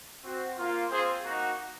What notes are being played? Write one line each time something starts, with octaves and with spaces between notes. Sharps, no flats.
C4 F#4
A#3 F4
C4 F4 G#4 C5
A#3 D#4 F#4